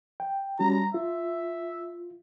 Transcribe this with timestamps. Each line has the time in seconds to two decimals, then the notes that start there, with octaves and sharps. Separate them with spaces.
0.20 G5
0.59 G3 C#4 F#4 A#5
0.94 F4 E5